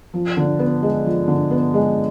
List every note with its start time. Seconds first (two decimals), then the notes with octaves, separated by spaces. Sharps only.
0.14 F3
0.37 D3
0.59 B3
0.82 G#3
1.05 F3
1.28 D3
1.51 B3
1.74 G#3